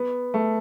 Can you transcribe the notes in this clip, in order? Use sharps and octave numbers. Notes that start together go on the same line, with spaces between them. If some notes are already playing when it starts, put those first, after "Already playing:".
Already playing: B3
A3